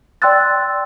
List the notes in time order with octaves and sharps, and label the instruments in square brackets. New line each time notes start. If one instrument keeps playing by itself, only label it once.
[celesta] D5 G5 C6 E6 F#6 A6